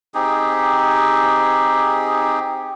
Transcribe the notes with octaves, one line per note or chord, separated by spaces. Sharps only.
C4 D#4 G4 G#4